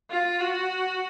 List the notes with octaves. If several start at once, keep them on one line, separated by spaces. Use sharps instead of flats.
F4
F#4